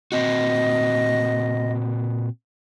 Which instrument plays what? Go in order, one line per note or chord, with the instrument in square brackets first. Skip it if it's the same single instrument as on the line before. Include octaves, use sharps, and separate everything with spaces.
[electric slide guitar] A#2 C4 F#4 [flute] D#5